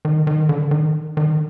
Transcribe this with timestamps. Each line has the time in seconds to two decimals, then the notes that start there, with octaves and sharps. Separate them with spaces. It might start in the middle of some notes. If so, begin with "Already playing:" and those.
0.05 D#3
0.27 D#3
0.49 D3
0.71 D#3
1.17 D#3